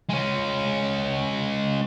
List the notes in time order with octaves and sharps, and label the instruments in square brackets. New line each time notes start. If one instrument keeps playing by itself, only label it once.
[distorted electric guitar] G#3 C#4